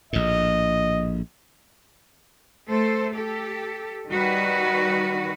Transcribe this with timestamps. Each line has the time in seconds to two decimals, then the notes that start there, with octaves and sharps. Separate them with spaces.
0.13 A#1 A2 D#5
2.68 A3 A4 C5
3.15 G4 A4
4.10 D#3 G3 F#4 B4